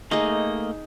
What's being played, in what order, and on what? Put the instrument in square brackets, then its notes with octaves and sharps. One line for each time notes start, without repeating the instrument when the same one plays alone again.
[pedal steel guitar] A3 A#3 D#5 [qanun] D#4 G#4